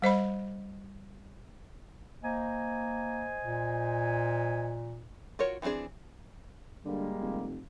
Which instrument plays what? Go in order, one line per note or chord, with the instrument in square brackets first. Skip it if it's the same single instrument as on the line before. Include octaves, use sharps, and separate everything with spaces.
[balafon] G3 C5 D#5 B5
[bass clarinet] A#3 [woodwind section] C5 D#5 G#5
[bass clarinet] A#2
[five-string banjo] F4 F#4 A#4 C#5
E3 B3 C4 D4 G#4
[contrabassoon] D3 [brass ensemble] G3 G#3 A#3
[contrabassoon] F1